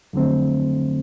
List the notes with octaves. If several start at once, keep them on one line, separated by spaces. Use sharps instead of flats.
F2 D3 F#3 A3 C4